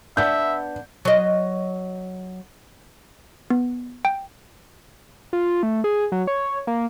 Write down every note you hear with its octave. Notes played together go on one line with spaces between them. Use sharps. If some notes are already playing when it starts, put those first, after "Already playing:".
B3 D4 E5 G6
F#3 D#5
B3
G5
F4
A3
G#4
F#3
C#5
A#3